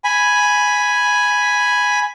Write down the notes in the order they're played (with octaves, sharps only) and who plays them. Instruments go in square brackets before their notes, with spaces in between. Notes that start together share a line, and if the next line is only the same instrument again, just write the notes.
[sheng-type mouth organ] G#5 B5